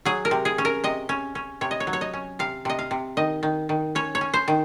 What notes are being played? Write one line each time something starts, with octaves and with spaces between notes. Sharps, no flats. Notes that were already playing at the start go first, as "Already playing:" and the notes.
F#3 G#4
A#4
C3
G#4
C#4
A#4
C3 D#5
C#4
C#4
C3 C#5
D#5
C#5
F#3
C#5
D#5
C#4
C3 F5
C3 D#5
F5
C3
D#3 D#5
D#3
D#3
C#4 C#5
C#5
C#4
C5
D#3